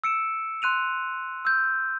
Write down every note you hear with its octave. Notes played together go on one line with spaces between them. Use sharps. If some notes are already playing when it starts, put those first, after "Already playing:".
E6 C#7 D7 E7
C6 F#6 D#7 F7
E6 G6